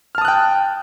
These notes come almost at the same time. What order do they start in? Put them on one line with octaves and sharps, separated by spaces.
F6 A5 D#6 F#6 G5